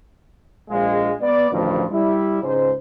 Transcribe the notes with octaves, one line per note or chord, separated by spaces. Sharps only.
A#1 G#3 F5
B3 D5
A1 D2 G2 D#3 F3
G3 E4
C#2 G#2 C5